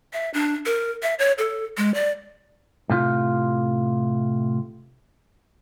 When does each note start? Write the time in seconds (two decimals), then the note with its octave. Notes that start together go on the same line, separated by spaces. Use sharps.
0.13 E5
0.34 D4
0.66 A#4
1.03 E5
1.19 C#5
1.38 A4
1.77 G#3
1.94 D5
2.90 A2 C3 F4